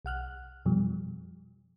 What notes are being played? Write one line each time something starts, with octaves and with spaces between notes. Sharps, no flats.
B1 F#5 F6 F#6
F2 B2 F3 G3